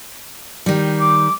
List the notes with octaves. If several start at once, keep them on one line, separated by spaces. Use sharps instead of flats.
D#3 G3
D6